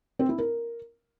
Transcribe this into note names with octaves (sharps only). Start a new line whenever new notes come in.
C4
E4
A#4